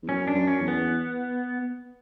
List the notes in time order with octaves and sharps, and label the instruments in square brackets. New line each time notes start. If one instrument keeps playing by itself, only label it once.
[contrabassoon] E2
[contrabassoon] F#2 [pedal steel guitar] C#4
[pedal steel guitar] D4
[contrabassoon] F#2
[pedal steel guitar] C#4
[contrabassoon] E2
[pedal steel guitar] B3